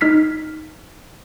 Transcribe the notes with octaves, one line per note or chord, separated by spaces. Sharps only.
D#4 F6 B6 C7